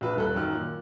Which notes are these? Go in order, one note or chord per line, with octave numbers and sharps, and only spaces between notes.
A#1 B4
D#1 A4 F#6
F#2 D#3 F6
A#2